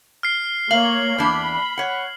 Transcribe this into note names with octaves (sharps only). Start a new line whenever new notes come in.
F6 C7
A#3 C#5 F5 F#7
E2 D4 B5
C#5 F#5